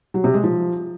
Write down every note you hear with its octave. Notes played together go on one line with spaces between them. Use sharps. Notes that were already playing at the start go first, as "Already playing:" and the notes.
F#3
C3
G#3
F3